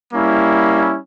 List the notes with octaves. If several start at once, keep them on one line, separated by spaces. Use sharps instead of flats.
G3 A#3 C#4 E4